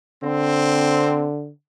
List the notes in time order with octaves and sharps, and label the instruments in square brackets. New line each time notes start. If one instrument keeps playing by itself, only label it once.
[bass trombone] D3 [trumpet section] C4